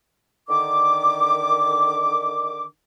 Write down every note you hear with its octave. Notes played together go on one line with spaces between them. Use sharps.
D3 D#3 D6